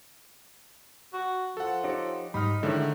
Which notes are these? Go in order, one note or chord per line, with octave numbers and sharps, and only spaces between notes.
F#4
F3 A4 F#5
D#4 G4 C#5
G#2 G3 D#4 B5 F6
A2 D3 D#3 G#3 E4